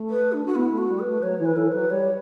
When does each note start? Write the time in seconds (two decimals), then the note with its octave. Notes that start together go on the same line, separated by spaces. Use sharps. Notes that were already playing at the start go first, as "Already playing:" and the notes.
Already playing: A3
0.09 B4
0.32 D4
0.46 F#4
0.55 B3 E4
0.72 A3
0.77 F#4
0.88 G3
0.99 B4
1.06 A3
1.22 F#3 C#5
1.39 E3
1.45 B4
1.56 E3 A4
1.67 C#5
1.72 F#3 B4
1.90 G3 C#5